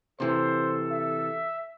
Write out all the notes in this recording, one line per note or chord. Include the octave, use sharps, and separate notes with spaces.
C3 E3 A4 C5
E5